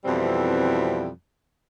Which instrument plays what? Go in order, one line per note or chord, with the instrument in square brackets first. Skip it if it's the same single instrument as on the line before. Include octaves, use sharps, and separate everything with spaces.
[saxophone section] F2 B2 E3 G3 C4 E4